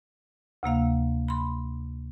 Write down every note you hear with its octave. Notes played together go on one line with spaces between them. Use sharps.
D2 C3 A#3 F5
B5 C6